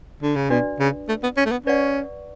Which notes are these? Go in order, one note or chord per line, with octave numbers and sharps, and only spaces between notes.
D3
C#3
B2 D4 F#4 B4 D5
C#3
A3
B3
C#4
A3
B3
C#4 B4 D5 F#5 C#6